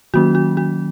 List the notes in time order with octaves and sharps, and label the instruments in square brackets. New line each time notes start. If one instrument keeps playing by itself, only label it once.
[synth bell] D#3 F#3 A#3 C#4 F#4
F#4
F#4